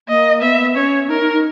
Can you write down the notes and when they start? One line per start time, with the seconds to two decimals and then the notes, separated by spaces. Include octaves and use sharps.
0.08 A#3 D#5
0.42 B3 E5
0.76 C#4 C#5
1.09 D#4 A#4
1.21 D#4
1.33 D#4